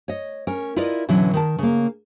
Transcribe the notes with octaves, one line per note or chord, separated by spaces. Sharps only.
C#5 D#5
C#4 A#4
E4 F4 A#4 B4 D5 D#5
B2 D3 E3 F#3 C#4 E4
D#3 A#4 A5
C#3 A#3